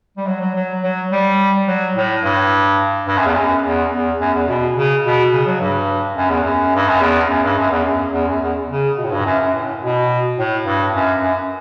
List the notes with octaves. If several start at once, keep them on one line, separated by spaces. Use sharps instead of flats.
G3
F#3
F#3
F#3
F#3
G3
F#3
A2
G2
G2
F#2
E2
F#2
E2
E2
F#2
E2
B2
C#3
B2
C#3
F#3
G2
F#2
E2
F#2
G2
F#2
E2
F#2
G2
F#2
E2
F#2
E2
F#2
E2
C#3
B2
A2
G2
F#2
F#2
A2
B2
A2
G2
F#2
F#2